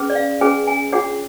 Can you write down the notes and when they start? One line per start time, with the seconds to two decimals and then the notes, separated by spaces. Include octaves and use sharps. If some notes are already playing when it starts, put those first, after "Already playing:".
Already playing: C#4 G#4 B4
0.10 D5
0.15 F5
0.41 C#4 G#4 B4 G#5
0.67 G#5
0.92 D4 F4 G#4 C#5 F#5